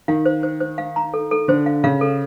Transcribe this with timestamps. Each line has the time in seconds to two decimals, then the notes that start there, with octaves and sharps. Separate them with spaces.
0.08 D#3 F5
0.26 C5
0.43 C5
0.60 C5
0.78 F5
0.96 A#5
1.14 A4
1.31 A4
1.48 D3 C5
1.66 F5
1.84 C#3 F5
2.01 A4